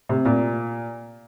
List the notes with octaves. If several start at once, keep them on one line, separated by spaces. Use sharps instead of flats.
C3
A#2